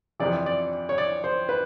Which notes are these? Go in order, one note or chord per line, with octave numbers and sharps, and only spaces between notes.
F2 C3 E3 D5
D5
C#5
D5
C5
B4